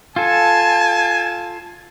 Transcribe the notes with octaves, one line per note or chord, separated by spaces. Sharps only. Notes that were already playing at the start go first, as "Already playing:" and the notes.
F4 A4 G#5 A5